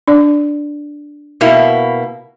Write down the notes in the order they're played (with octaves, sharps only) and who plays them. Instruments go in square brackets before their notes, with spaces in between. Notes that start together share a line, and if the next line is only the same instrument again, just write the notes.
[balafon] D4 D5
[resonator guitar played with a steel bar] B2 A#3 E4